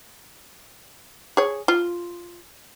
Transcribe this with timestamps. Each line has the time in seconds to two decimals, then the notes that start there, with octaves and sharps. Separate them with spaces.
1.37 G#4 C#5
1.68 F4